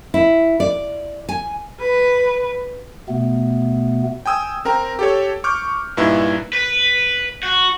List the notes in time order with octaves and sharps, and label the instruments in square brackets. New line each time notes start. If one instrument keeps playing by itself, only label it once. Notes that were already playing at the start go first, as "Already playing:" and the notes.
[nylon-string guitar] E4
D5
G#5
[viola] B4
[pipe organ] B2 A3 B3
[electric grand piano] G5 G#5 D#6 E6
C4 A#4 G5 A#5
G4 A4 C#5
C#6 D6 F6 G6
G2 A#2 D#4 E4 B4 E6
[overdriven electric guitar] B4
F#4